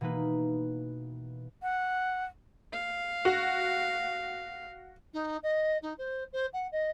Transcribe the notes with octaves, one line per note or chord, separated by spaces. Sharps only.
B2 E3 A#3 D#4 B4
F#5
F5
F#4
D#4
D#5
D#4
C5
C5
F#5
D#5